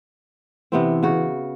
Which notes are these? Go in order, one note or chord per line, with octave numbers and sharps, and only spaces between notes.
C3 E3 B3 C4
C#3 F#4